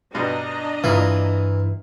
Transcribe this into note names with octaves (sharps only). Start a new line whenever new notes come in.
G2 B2 D4 D#5 A#5
G2 A#2 E3